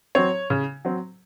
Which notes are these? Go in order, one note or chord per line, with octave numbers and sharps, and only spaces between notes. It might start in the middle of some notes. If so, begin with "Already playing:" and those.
F#3 C4 C#5
C#3
F#3 C4